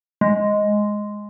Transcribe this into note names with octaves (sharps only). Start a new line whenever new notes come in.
G#3